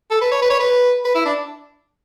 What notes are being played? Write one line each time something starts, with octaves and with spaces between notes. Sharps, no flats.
A4
B4
C#5
B4
C#5
B4
B4
E4
D4